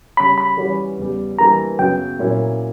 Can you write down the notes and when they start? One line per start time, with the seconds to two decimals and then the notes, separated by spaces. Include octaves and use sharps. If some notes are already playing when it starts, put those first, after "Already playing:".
0.17 C#3 G3 C#4 B5
0.38 B5
0.57 E3 G3 C#4 F#4
0.97 E2 C#3 G3
1.39 E3 G3 A#3 D4 A#5
1.79 F#2 C#3 F#3 B3 G5
2.19 A#2 F#3 A#3 C#4 E4